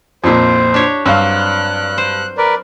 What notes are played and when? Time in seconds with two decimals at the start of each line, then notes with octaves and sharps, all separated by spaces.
0.24 F2 A#2 D#4 E4 C5
0.74 D4 G4 C#5
1.06 G2 F#3 C4 F5 F#6
1.98 C5
2.38 A#4 B4 D5